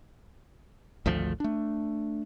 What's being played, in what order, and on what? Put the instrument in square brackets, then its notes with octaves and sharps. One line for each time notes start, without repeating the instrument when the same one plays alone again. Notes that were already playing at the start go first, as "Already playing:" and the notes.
[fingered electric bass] G#1 D2 F3 A3
A3 D4